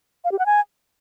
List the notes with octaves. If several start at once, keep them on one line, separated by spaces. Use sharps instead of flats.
F5
G4
F#5
G#5